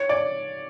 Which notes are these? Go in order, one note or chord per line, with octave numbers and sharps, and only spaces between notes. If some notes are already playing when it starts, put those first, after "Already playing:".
Already playing: C#5
D5